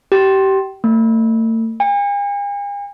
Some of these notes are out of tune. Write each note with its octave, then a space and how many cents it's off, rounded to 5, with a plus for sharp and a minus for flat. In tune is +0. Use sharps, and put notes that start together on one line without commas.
G4 -25
A3 +40
G#5 -45